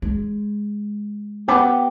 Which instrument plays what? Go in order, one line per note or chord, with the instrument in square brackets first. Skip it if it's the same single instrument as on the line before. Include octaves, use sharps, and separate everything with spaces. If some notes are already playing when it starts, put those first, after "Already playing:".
[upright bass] G#3
[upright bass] B3 [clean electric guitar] G4